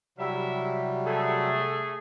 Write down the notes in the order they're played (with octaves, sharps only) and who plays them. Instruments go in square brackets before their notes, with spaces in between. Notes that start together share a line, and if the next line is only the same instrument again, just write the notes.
[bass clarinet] C3 [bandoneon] F#3 G3 [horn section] E4 E5
[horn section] A3 G#4 [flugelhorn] A4